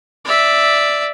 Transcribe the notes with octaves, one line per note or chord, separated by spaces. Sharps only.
D5 E5